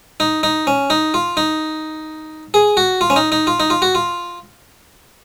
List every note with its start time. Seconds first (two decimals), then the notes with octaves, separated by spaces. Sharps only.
0.20 D#4
0.43 D#4
0.67 C#4
0.90 D#4
1.14 F4
1.37 D#4
2.54 G#4
2.77 F#4
3.01 F4
3.10 C#4
3.16 D#4
3.32 D#4
3.47 F4
3.60 D#4
3.70 F4
3.82 F#4
3.95 F4